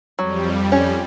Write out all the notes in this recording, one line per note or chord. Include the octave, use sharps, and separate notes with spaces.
F2 F#3 G3
C#4